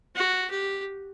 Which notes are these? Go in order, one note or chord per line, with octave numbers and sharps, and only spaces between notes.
F#4
G4